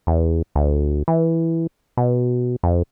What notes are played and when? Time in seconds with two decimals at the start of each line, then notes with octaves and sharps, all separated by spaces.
0.07 E2
0.55 D2
1.08 E3
1.97 B2
2.63 F2